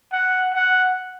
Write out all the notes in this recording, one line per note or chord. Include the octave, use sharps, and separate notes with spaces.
F#5
F#5